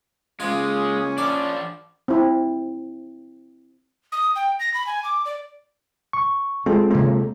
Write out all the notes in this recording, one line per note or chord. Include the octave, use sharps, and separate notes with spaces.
C#2 G#3 A#3 C#4 F4
F3 D4 D5
C4 E4
D#6
G5
A#6
B5
G#5
D6
D5
C#6
G#3 C4 F4 A4
C3 A#3 C4